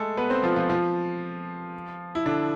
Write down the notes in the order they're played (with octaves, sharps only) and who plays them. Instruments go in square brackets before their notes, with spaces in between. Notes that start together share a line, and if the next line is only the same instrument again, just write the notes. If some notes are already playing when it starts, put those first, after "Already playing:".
Already playing: [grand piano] G#3 A3 G#4 A4
B3 B4
C4 C5
F3 F4
F3 F4
F3 F4
E4
D3 D4